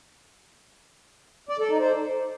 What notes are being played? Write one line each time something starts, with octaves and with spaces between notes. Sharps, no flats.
D5
A4
D#4
C5